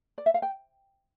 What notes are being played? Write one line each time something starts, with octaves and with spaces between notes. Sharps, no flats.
D5
E5
F5
G5